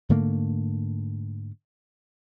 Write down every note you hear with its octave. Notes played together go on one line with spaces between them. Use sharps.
G#2 D3 A3 A#3